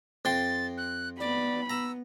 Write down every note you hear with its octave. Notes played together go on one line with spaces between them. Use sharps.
F2 G5 C6 A6
F#6
B3 D5 B5
B3 A#5 E6